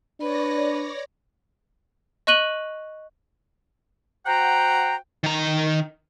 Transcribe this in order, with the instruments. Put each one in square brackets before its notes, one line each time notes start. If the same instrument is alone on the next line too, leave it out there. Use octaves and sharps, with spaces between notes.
[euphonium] D4 [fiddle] B4 [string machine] C#5 D5 A#6
[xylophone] D#5 C#6 F#6 D#7 F#7 G7
[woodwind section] F#4 C5 F#5 G5 A#5
[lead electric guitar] D#3 A#5